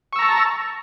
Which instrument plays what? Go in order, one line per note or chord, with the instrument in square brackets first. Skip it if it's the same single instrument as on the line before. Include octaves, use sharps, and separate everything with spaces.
[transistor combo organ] C#6
E6
A#5
A5